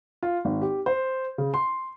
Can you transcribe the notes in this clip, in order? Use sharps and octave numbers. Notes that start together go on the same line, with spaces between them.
F4
G#1
G4
C5
C#3
C6